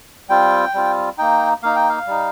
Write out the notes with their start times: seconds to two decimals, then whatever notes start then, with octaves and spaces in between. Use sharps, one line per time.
0.29 G3 C4 F4 G5
0.74 G3 C4 F4
1.18 A#3 D#4 G5
1.63 A#3 D#4 F5
1.76 G5
1.89 F5
2.07 G3 D#4